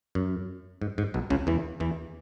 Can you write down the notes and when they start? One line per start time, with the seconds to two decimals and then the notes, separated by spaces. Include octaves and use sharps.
0.15 F#2
0.82 G#2
0.98 G#2
1.14 B1 B2
1.30 C#2 C#3
1.47 E2 E3
1.80 E2 E3